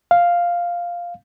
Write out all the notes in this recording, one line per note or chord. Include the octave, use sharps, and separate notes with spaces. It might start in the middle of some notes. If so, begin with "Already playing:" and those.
F5